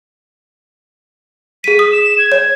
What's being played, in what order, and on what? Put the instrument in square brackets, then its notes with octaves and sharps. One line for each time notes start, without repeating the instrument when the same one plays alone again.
[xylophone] G#4 D#7 [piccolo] B6
[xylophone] D#6
[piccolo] E7
G#6
[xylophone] C#5